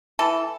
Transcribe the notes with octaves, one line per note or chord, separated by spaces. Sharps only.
E3 A4